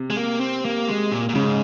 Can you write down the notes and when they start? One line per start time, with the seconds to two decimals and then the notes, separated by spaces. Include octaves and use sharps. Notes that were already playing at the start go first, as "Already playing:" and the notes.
Already playing: C3
0.10 G#3
0.17 A#3
0.40 C4
0.65 A#3
0.88 G#3
1.12 A#2
1.29 A#2
1.34 G#2 C#3